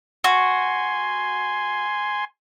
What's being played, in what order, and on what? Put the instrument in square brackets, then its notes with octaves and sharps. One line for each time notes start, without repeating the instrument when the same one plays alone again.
[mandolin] F#4 [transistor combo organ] G#5 C6